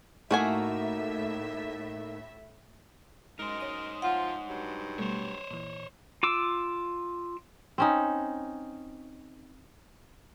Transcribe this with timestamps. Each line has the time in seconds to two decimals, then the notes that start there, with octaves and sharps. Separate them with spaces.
0.31 A2 A3 A#3 D#4 E4 F#4 E5 G#5
3.39 F#2 G#3 D#4 A#4 C5 D#5
3.60 C#5 D#6
4.02 F3 F4 F#5
4.49 G2 F#3
4.98 B2 G3 A3 C5 C#5
5.51 A#2 E3
6.23 F4 D6 E6
7.78 C4 C#4 D#4